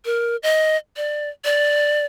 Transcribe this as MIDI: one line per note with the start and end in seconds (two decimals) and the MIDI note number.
0.05 0.36 70
0.43 0.77 75
0.97 1.29 74
1.45 2.06 74